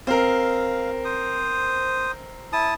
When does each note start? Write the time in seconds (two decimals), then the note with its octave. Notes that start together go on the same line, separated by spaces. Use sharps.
0.07 C4 A#4 F5
1.05 C5 D#6
2.53 E4 A5 D#6